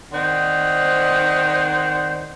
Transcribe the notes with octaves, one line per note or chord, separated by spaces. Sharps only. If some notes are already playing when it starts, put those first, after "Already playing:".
D#3 C4 C5 D5 F#5 C6